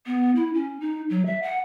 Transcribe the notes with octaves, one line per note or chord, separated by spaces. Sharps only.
B3
E4
C#4
D#4
F#3
E5
F#5